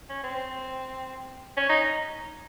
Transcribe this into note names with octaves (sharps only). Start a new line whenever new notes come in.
C#4
C4
C#4
D#4